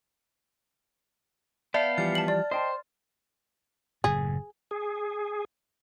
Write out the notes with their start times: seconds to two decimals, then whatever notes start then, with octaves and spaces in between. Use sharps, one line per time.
1.74 B3 D5 E5 F5 A5
1.98 E3 F3 G3 F6 A6
2.15 A5 F#7
2.28 D5
2.51 C5 D#5 G5 A5
4.04 F#1 A2 G#4
4.71 G#4